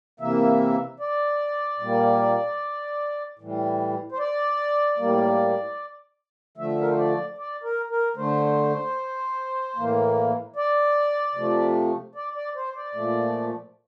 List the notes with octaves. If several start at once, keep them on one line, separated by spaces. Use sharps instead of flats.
C3 E3 A#3 E5
D5
A#2 G3 A#3
A2 E3 G3
C5
D5
A2 G3 A#3
D3 F3 A3 E5
A#4
C5
D5
D5
A#4
A#4
D3 A3 C5
A2 E3 A#3
D5
C3 F3 A3
D5
D5
C5
D5
A#2 F3 A3